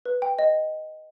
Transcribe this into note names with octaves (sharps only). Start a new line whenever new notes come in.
B4
G5
D#5